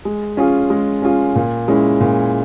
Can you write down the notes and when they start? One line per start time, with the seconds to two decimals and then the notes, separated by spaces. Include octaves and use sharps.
0.05 G#3
0.37 C#4 F4 G#4
0.70 G#3
1.02 C#4 F4 G#4
1.35 A#2
1.68 G#3 C#4 E4
2.00 A#2